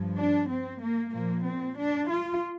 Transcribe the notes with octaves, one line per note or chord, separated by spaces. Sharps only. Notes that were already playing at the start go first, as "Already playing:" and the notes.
Already playing: G2 F3
D4
C4
A#3
A#2 F3 A#3
C4
D4
F4